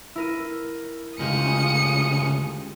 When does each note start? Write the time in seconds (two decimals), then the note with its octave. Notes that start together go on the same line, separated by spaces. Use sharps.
0.16 E4 A#4 D#7
1.19 D2 C#3 G#3 F4 G4 D#6 C#7